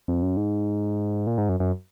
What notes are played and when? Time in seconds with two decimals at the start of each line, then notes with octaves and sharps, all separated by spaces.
0.08 F2
0.22 F#2
0.37 G#2
1.27 A#2
1.38 G#2
1.49 F#2
1.60 F#2